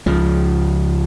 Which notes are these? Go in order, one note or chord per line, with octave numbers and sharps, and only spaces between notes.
C#2 C#3 F3